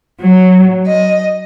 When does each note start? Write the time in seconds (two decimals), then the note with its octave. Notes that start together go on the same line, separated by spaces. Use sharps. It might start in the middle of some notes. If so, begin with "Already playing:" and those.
0.20 F#3
0.86 D#5